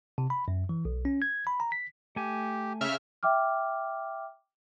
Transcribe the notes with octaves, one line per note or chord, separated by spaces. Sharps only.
C3
B5
F#2
E3
B1
C#4
G#6
B5
A#5
B6
A3 G4 G#5
C#3 E5 F6
E5 G5 D6 F6